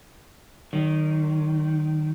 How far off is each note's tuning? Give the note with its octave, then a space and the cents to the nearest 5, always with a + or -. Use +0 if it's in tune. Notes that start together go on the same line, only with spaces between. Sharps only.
D#3 -15 F#3 +25